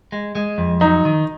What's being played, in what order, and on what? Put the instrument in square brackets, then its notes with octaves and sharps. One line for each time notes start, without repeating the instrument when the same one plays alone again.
[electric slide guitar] G#3
G#3
F2
[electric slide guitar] F#3 [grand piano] D#4
[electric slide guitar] D#3